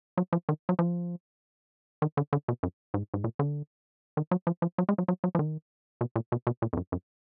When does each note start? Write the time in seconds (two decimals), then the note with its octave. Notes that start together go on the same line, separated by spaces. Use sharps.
0.17 F#3
0.33 F3
0.49 D#3
0.69 F#3
0.79 F3
2.02 D#3
2.17 D3
2.33 D3
2.48 B2
2.63 F#2
2.94 G#2
3.14 G#2
3.24 A#2
3.39 D3
4.17 D#3
4.31 F#3
4.47 F3
4.62 F3
4.78 F#3
4.89 G#3
4.98 F#3
5.08 F#3
5.24 F#3
5.35 F3
5.39 D#3
6.01 B2
6.16 A#2
6.32 B2
6.47 B2
6.62 A#2
6.73 F2
6.77 F#2
6.92 F#2